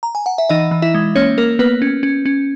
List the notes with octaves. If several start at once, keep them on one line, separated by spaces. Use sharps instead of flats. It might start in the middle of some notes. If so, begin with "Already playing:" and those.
A#5
G#5
F#5
E5
E3 D#4 D#5
E3
E4 E5
G#3
A#3 C#4 C#5
A#3 A#4
A#3 B3 B4
C#4
C#4
C#4